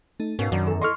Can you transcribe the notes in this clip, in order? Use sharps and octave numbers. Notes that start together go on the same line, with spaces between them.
A3 D#4 A4
G#2 B2 C#4 A#4 B4 F5
F#2 D#3 F#3 D4 D5 A#5
E2 A4
E4 A4 D#5 C6 C#6 F6